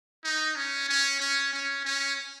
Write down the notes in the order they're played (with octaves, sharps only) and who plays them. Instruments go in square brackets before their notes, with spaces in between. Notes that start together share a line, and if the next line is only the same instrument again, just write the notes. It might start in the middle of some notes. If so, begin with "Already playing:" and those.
[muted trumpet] D#4
C#4
C#4
C#4
C#4
C#4